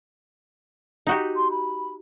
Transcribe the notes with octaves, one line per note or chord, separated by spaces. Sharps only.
D#4 F#4 G4
C6
B5